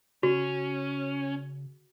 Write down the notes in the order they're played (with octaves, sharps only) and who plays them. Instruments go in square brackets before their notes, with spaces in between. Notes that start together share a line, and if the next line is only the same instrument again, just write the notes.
[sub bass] C#3 [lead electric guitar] C#4 [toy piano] F#4